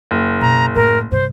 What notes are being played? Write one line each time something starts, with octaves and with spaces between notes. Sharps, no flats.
F#1
B2 A#5
A2 A3 A#4
G2 C3 C5